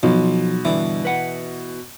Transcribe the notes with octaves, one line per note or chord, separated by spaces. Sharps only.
B1 B2 F3
G2 D3 E3
B4 F#5